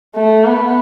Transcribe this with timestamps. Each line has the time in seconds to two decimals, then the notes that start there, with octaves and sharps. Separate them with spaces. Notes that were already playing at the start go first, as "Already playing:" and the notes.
0.15 A3
0.45 B3